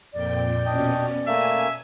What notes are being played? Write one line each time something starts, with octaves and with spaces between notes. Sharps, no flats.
F2 A#2 D5 G5
B2 C#4 D4 D#5 G5
A3 A#3 E5 G#5